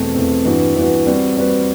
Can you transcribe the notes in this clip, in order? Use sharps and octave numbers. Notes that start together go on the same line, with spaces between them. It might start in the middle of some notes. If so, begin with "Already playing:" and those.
Already playing: E2 B2 A3 C4
E2 B2 A3 C4
G2 E3 B3 F#4
G2 E3 B3 F#4
G3 C4 F#4 B4
G3 C4 F#4 B4